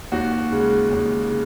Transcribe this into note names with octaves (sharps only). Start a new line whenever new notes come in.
D#2 F#4
C#3 G#3
D#2
C#3